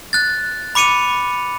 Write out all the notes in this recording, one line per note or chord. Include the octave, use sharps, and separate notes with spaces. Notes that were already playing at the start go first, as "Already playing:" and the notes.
F#6 A6
B5 D6 C#7 D#7 F7